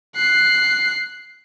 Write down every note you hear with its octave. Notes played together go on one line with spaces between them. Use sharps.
F#6 C7